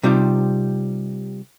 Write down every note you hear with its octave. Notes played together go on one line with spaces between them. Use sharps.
C3 G3 D#4 F4 G4